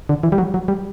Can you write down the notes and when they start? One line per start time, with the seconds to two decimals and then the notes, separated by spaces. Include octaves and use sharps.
0.09 D3
0.23 E3
0.32 G3
0.38 F#3
0.54 F#3
0.68 G3